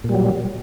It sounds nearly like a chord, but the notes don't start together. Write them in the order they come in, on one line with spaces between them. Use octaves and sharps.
A#2 G3 F#3